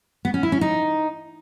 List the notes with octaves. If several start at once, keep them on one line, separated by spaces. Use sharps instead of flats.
B3
C#4
E4
C#4
D#4